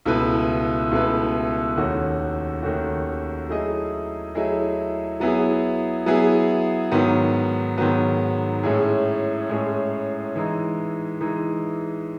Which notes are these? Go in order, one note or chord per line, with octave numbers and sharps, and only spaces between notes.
C#2 B2 A3 E4 B4
C#2 B2 A3 E4 B4
D#2 D#3 A3 C#4 F#4
D#2 D#3 A3 C#4 F#4
F#3 A3 E4 G#4 D#5
F#3 A3 E4 G#4 D#5
F#3 B3 E4 G#4
F#3 B3 E4 G#4
G#2 D#3 F#3 B3
G#2 D#3 F#3 B3
A2 G#3 C#4 E4 G#4
A2 G#3 C#4 E4 G#4
E3 G#3 D#4
E3 G#3 D#4